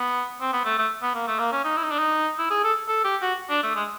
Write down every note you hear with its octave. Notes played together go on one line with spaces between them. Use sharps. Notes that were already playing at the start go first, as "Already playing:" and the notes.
Already playing: B3
C4
B3
A3
A3
B3
A#3
A3
A#3
C#4
D#4
E4
D#4
D4
D#4
E4
G#4
A4
A4
G4
F#4
D4
A3
G#3